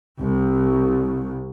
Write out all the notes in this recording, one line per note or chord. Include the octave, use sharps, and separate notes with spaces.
C2